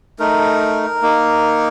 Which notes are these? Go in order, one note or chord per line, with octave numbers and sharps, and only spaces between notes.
A3 D#4 A#4
A#3 D#4